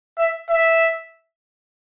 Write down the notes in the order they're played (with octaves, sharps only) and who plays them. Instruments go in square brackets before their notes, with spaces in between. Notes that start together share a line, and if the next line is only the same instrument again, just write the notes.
[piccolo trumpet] E5
E5